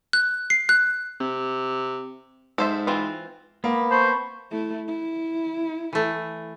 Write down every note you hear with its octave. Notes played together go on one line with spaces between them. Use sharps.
F#6
C7
F#6
C3
G#2 A4 C5 E5
E3 C4 F4
A#3 B3
C5 A5 B5 C#6
A3 E4
E4
E3 A3